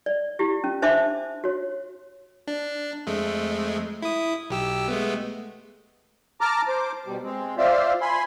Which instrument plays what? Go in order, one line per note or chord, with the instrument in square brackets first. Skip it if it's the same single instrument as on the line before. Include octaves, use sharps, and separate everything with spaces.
[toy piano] D5
E4 F4 G4
C#4
D4 C5 E5 A5 C6 D6
F#4 C#5
[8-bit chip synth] D4
F2 G#3 A3
E4 D#6
B1 G4 E6
G#3 A3 B3
[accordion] A5 A#5 D6 F6
C5 D6
B2 G3
G#3 C4
F4 C5 D5 E5 F5
G#5 B5 C6